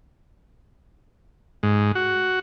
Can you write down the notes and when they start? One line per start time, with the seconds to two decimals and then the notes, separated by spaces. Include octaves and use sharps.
1.63 G#2
1.95 F#4